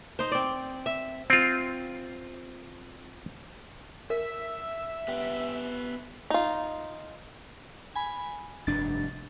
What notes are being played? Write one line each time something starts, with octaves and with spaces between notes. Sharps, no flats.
D#4 C5
C4 D5
E5
C4 F4
A#4 E5
B3 G4
D#4 F4
G#5 B5
F1 G2 D4 A6